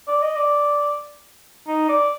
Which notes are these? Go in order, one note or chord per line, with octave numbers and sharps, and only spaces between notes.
D5
D#5
D5
D#4
D5